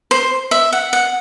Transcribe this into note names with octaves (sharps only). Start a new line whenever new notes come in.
C5
E5
F#5
F#5